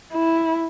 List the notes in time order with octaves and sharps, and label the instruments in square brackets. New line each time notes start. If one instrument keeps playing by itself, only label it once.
[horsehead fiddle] E4